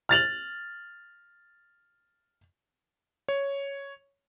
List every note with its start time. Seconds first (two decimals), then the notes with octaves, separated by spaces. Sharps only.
0.09 F6 A6 F7 F#7
3.29 C#5